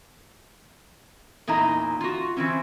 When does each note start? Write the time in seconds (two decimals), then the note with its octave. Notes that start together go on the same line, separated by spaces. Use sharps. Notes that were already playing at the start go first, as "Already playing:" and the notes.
1.47 E2 A#2 D#4 E4 A#5
2.01 F4 F#4
2.37 E3 C4 C#4